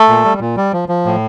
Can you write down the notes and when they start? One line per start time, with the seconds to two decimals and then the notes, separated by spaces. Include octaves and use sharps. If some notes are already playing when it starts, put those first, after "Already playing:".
Already playing: A3 A4
0.09 A#2
0.25 G3
0.40 A#2
0.57 G3
0.73 F3
0.89 F3
1.05 A2